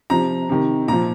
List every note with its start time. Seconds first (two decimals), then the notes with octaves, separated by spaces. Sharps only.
0.10 C3 F3 A#5
0.49 C3 D#3
0.88 A#2 F3 A#5